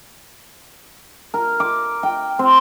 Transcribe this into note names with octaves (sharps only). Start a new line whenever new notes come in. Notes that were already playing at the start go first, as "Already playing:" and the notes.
A#4
D6
G5
C4